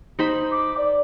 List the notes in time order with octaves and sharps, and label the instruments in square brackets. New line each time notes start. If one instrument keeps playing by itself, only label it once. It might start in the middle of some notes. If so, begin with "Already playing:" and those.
[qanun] D#4 C5 B5
[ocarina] D6
D5